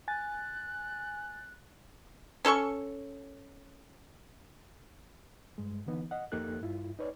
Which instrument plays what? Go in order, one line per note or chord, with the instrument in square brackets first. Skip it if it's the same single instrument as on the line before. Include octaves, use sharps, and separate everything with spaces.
[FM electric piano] G#5 A6 [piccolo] F#6
[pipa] C#4 A4 C6 C#6
[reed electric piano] G2 G#3
D3 E3 B3 D#4
D#5 F#5
F2 A#3 D#4 G4 A4 F#6
G2 E4 F4
D#4 B4 C#5 D5